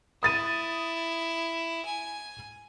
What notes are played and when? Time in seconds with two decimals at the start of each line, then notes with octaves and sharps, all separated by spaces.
0.23 E4 D#6 A6 D#7
1.86 G#5